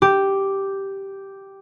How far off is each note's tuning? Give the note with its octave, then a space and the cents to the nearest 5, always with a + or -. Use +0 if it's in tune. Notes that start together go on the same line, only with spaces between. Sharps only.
G4 -5